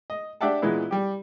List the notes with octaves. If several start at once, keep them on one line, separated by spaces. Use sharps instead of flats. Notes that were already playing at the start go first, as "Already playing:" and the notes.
D#5
D4 G4 D5 E5 F#5 A5
A#2 E3 G#3 B3 E4
G3 G4